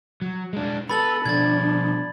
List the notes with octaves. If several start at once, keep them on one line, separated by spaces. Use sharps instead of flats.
F#3
G#3 D4
B3 A4 B5 A6 F#7
B2 F3 D4 G#6 A6